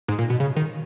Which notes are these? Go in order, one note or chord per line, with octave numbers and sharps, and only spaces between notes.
G#2
A#2
B2
C#3
D#3